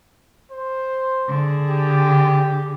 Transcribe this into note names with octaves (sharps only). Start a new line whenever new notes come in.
C5
D3 G#4
G4